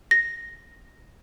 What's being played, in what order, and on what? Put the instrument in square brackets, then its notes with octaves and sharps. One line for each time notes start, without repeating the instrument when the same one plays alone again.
[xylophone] A#6